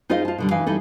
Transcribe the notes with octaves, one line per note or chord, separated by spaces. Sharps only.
D#4 F4 G#4 C5 D#5 F5
F4 A5
B2 D3 G3
E3 D#4 F5
G3 D#4 E4 A4